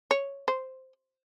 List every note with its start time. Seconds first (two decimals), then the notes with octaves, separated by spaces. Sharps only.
0.11 C#5
0.48 C5